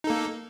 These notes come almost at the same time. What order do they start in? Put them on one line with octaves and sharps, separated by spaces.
D#4 A4 A#3